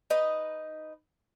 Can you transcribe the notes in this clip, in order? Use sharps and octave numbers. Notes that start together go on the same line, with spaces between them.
D#4 B4 D#5